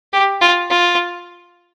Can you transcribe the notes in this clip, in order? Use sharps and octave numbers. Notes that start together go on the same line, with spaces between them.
G4
F4
F4